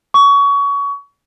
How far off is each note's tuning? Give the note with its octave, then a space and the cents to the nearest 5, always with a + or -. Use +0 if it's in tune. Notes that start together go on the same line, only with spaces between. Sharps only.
C#6 +25